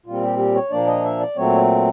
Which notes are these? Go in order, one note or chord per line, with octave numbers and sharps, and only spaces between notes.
A#2 G3 C4 F4
G4
G4
C#5
A#2 F3 A#3 D4 D5
D#5
E5
D5
A#2 F#3 A3 C4 C#5